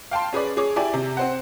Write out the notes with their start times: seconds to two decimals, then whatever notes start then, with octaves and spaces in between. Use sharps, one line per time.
0.11 F5 G5 A5 C6
0.33 C#4 G#4 B4 D5
0.57 G#4 C#5 D6
0.76 E4 G4 D5 G#5
0.94 C3
1.17 C4 C5 F#5